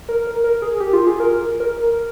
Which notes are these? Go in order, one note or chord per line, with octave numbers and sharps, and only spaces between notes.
A#4
A#4
A#4
G#4
G4
F4
G#4
A#4
A#4